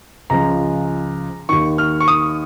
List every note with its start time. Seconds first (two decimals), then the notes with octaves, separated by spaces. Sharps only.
0.30 C#2 C#3 F3 A#5
1.49 D#2 D#3 C#6
1.78 F6
2.00 C#6
2.08 D#6